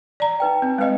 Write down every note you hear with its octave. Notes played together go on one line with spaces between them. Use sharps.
D5 A#5
D#4 B4 G5
C4
G#3 D#4 B4 D#5 F5